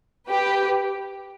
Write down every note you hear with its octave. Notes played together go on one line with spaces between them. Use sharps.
G4 B4